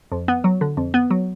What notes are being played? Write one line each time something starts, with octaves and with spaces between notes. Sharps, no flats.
F2
B3
F#3
D3
F2
B3
F#3